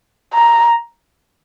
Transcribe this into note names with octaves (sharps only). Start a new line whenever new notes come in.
A#5